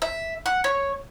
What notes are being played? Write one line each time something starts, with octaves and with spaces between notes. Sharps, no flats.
E5
F#5
C#5